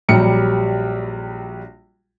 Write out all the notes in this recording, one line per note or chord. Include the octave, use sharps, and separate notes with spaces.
A#1 F#3 G3 G4 C#7